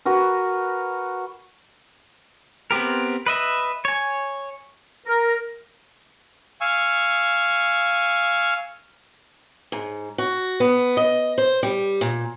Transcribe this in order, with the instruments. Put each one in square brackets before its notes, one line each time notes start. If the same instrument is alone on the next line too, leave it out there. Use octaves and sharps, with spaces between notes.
[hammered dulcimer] F#4 A#4 B4
[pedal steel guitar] B3 C4 G4 A#4
B4 D#5 E5
C#5 G#5
[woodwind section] A#4
[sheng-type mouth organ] F5 G#5 C#6 E6
[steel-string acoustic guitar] G#2
F#4
B3
D#5
C5
G3
A#2